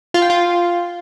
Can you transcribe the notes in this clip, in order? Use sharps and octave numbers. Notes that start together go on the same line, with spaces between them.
F4
G5
F4